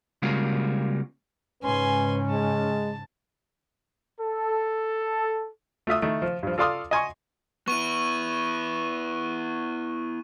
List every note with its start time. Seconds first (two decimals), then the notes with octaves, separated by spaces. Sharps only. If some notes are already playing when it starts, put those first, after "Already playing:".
0.22 C#3 G3 G#3 A#3 F4 F#4
1.63 G#2 C#3 C#4 B4 G#5 C6
2.31 G#3 A5
4.19 A4
5.87 A3 F4 E5 D#6
6.02 D#3 A3 E4
6.22 F3
6.43 G2 F3
6.58 F4 A4 D5 F5 C6 D#6
6.91 D#5 G#5 C6 C#6
7.68 B3 E4 C#6 D#7